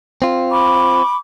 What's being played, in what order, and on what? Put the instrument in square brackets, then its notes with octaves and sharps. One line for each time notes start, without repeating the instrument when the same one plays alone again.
[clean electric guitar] C4 F4
[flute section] B5 C#6 D6